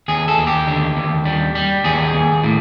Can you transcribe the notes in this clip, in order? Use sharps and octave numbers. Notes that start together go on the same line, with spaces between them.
D#2 G#4
A4
D#2
G4
D3
D#2
G3
G3
D#2 G#4
D#2
A2